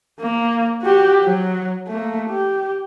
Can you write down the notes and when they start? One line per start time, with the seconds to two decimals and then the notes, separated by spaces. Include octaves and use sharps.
0.20 A#3
0.82 F#4 G4
1.23 F#3
1.88 A3 A#3
2.30 G4